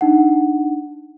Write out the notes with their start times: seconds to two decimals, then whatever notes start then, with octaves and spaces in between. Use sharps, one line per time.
0.01 D4 D#4 F#5